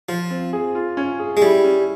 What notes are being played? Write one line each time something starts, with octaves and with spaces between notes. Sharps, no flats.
F3 F4
C4
G#4
F4
C#4
G#4
G#3
G3 E4
C#4